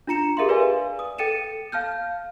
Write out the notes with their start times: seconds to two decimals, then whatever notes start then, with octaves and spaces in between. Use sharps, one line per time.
0.07 D4 F4 A#5 C#7 E7
0.37 G4 G#4 A#4 E5 F5 C6
0.49 B4 D5 F5 G#5
0.99 D#6
1.18 A4 G5 A6 C#7 D#7 E7
1.72 F5 A5 F6 G6